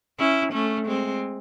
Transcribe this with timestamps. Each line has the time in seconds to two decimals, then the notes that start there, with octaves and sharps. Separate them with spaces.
0.19 C#4 E4
0.53 A3 C#4
0.88 G#3 C4